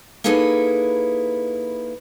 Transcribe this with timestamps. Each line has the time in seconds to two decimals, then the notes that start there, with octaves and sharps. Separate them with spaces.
0.24 A#3 D#4 E4 G#4 A4 B4